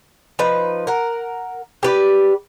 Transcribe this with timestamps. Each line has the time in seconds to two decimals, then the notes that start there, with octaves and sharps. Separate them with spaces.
0.39 F3 D#4 B4
0.87 A#4 F#5
1.83 G4 B4 D5